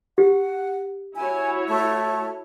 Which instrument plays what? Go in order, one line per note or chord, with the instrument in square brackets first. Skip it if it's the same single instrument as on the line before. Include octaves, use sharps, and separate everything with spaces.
[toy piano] G4 [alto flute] F#5
[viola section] E4 F#4 C#5 [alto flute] G#5
[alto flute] A3